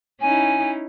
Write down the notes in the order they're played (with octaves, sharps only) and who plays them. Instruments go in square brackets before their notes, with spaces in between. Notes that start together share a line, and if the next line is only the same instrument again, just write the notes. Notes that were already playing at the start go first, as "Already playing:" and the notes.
[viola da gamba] C#4 D#4 E4 [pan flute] G#5